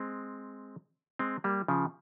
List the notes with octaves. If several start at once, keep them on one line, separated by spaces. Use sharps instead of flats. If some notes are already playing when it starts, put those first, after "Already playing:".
Already playing: G#3 C4
G#3 C4
G3 A#3
C#3 F3